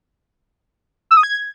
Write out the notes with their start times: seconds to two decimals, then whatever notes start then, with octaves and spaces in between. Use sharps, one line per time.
1.11 E6
1.17 D#6
1.23 G#6